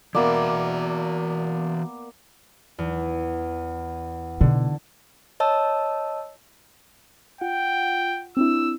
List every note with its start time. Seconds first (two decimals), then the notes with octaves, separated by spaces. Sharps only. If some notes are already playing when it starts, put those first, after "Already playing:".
0.15 E3 A#3 B3 F#4 D5 E5
2.79 E2
4.41 B2 D3
5.40 C#5 D#5 A5 E6
7.41 F4 F#5 G5
8.37 C4 D4 E4 E6